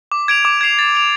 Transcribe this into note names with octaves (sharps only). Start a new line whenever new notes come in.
D6
G#6 D7 F7
D6
G#6 C7 F7
A6
D7 F7